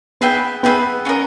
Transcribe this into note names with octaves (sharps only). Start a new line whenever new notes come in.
B3 G#4 B4 E5 G5
B3 G#4 B4 E5 G5
C#4 F4 A#4 D#5